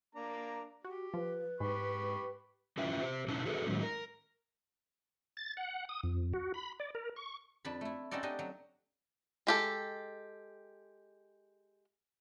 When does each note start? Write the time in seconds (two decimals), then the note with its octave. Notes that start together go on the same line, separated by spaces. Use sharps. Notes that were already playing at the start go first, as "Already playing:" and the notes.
0.15 A#3 D4 A#5
0.85 F#4 G4
1.14 F3 B4
1.60 G#2 G4 B5 C#6
2.78 C#4 E4 F4 B4 E5 G5
3.02 G4 C5
3.28 B2 C#4 D#4 E4 A5
3.45 F#4 G#4 A4 B4 D5
3.67 A2 D#3 F#3 G#3 C#4 D#4
3.82 A#4
5.37 A6
5.57 F#5
5.89 D#6
6.03 F2
6.34 F#4
6.54 B5
6.80 D5
6.95 A#4
7.16 C#6
7.65 F2 D4 A5 B5
7.81 A3 E4
8.11 C4 C#4 D#4 F#4 A4 D5
8.23 D4 D#4 G4 D#5
8.39 F#3
9.47 G#3 G4 A4